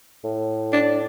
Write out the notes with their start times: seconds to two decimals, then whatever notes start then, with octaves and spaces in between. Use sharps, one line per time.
0.24 A2
0.72 D4